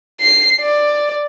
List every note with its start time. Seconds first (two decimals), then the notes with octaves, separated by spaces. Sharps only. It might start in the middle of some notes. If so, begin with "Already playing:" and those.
0.21 C7
0.60 D5